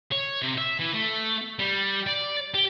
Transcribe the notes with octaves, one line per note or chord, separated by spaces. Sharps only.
C#5
C3
E5
E3
A3
G3
D5
G4